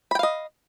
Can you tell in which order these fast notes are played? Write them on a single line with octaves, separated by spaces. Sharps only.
B5 G5 F5 D#5